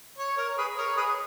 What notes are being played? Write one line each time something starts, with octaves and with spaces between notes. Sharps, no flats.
C#5
A#4 C#5
G#4 B4 D#5
A#4 C#5
G#4 B4 D#5